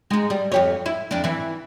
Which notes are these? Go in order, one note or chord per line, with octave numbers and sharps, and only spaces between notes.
G#3 D#4
G3
F2 G4 C#5
E4
F2 D4
E3 E4